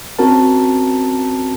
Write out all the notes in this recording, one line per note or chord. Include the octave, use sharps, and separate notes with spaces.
C4 C#4 F#4 A#4 A5